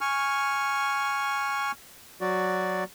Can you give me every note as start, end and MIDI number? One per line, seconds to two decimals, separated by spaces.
0.01 1.72 80
0.01 1.72 85
0.01 1.72 89
2.21 2.84 54
2.21 2.84 66
2.21 2.84 74